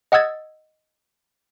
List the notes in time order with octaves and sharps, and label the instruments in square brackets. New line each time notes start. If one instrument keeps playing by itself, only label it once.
[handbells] D#5 F#5 D#6 E6 G#6 A6